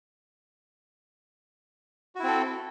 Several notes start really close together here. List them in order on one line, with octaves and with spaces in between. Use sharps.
F#4 E4 C4 A4